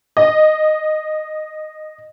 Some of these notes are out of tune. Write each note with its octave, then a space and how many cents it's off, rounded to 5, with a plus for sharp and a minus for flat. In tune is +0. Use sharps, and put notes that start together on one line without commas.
D#5 -15